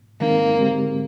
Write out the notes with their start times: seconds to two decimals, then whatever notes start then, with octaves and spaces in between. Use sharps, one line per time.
0.20 D#3 G#3 A#3 C4 D#4
0.59 D3 G#3 C4 G4